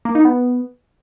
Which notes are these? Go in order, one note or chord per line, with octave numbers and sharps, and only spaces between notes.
A#3
D#4
B3